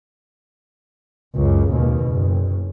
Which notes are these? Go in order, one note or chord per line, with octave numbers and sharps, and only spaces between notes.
C#2 F#2
D#2 B2
F#1